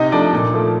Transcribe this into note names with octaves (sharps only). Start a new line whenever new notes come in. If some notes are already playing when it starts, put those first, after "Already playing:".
Already playing: C3 D#4 D#5
F3 A3 D4 D5
A#2
F3 A3